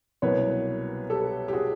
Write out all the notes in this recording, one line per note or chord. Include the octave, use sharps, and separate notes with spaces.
C2 B2 F#3 A#3 B4 C#5
G4 A4
G4
F#4 G#4